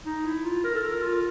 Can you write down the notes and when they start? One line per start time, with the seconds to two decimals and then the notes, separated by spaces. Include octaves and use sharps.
0.06 D#4
0.25 E4
0.45 F4
0.64 A#4
0.75 A4
0.84 A#4
1.02 F4